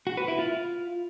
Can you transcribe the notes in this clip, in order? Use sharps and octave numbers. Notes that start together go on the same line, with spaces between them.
F#4
B4
E4
F4